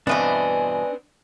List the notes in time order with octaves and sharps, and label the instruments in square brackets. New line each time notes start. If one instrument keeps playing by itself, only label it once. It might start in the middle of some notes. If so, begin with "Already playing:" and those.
[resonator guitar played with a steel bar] E2 G2 B2 [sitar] B3 C4 [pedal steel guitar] D4 D#5 [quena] G#5